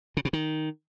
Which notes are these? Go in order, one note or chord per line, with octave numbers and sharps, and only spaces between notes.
C#3
B2
D#3